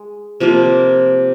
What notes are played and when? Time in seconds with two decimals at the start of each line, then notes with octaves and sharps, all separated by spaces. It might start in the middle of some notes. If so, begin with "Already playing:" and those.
Already playing: G#3
0.40 C3 F3 A#3